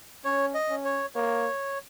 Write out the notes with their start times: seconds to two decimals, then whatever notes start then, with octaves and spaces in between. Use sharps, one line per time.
0.25 C#4 C#5
0.54 D#5
0.69 C#4
0.85 C#5
1.15 A#3 C#5